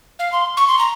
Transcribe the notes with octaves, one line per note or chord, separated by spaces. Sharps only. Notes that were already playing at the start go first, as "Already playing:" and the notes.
F5
C6
C#6
C6
A#5